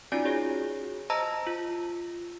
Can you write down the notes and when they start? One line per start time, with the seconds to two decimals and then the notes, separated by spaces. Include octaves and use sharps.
0.12 C#4 D#4 F4 F#4 D5 G#5
0.25 F#4 G#4 C#5 A#6
1.10 C5 D#5 A5 A#5 E6 A#6
1.47 F4